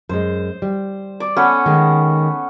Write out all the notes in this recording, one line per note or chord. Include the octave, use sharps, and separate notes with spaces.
F#2 G#3 C5
G3
D5
B3 C#4 A4
D#3 G#3 A#3